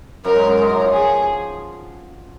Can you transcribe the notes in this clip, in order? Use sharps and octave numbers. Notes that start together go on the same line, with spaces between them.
F#2 F#3 A#4
G#2 G#3
F#2 F#3
G#2 G#3 A#4
F#2 F#3
F3
G#4